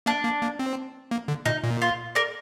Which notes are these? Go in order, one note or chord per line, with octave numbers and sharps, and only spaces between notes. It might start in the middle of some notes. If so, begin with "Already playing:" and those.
A#3 D4
A#3
A#3
C4
A#3
D3
A#2 D#4
A#2
F4
A#4 D5